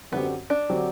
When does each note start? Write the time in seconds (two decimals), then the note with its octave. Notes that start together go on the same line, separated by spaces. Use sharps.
0.12 F#2 D3 F#3 B3 C4 G4
0.50 D4
0.69 D3 F#3 C4 G4